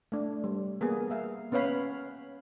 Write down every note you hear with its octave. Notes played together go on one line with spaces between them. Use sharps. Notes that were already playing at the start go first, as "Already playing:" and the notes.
A3 D4
G3
A#3 B3 G#4
A#3 E5 F5
B3 C#4 B4 C#5 F5 B5